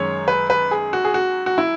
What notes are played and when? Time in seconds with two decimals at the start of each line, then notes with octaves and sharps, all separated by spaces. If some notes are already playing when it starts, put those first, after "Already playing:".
Already playing: F#2 D#3 G#3 C#5
0.28 B4
0.50 B4
0.71 G#4
0.93 F#4
1.05 G#4
1.14 F#4
1.46 F#4
1.58 E4